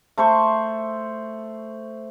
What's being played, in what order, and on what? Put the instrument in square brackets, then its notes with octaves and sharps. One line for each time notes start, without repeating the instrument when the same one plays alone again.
[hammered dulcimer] A3 C5 C6 C#6